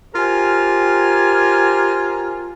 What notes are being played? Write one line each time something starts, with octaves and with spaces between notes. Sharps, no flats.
F4 G4 A#4 C5 G#5